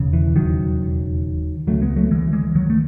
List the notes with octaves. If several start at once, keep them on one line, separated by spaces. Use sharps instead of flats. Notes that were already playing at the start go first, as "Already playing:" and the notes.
Already playing: E1 D#2 C#3
E3
D#3 F#3
C#2 C#3 F#3 A3
G#3 B3
F#3 A3
E3 G#3
E3 G#3
D#3 F#3
A3